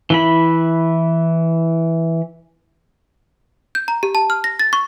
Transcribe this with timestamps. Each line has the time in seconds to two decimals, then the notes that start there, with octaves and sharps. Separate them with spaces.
0.10 E3 E4 B5
3.75 G6
3.88 A#5
4.03 G4
4.15 A5
4.30 F6
4.44 A#6
4.59 A6
4.73 C#6